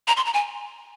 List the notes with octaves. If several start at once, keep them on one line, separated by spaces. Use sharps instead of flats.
A#5
C6
A#5
G#5